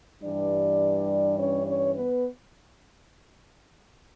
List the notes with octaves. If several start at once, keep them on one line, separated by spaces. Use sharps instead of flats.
G2 E3 G3 D4 D5
C#4 C#5
C#4 C#5
B3 B4